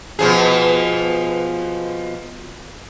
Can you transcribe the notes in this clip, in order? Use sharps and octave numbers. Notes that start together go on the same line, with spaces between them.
B2 F3 G#4